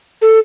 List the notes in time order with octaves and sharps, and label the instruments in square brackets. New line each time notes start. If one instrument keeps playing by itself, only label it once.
[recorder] A4